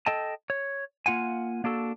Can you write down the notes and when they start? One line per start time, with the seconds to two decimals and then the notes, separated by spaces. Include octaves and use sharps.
0.06 A4 D#5 G5 A5
0.50 C#5
1.06 A#3 F4 F#5 G#5
1.64 A#3 D4 F#4 A4